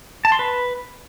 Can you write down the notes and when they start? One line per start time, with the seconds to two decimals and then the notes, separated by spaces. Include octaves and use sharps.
0.25 A5
0.32 C6
0.39 B4